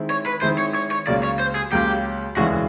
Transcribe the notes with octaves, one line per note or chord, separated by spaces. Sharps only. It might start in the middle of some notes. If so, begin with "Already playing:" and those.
Already playing: D#3 G#3 C4 E4
C#5
B4
D#3 G#3 C4 E4 C5
C#5
C#5
C#5
C#2 C#3 F#3 A#3 D5
C#5
C5
G#4
C#2 C#3 F#3 A#3 G4
E1 D2 C#3 E3 G#3 F#4